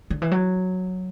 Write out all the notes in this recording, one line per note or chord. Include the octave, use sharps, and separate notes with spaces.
D3
E3
F#3